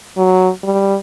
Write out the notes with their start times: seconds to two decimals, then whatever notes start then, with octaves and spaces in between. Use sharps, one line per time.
0.17 F#3
0.64 G3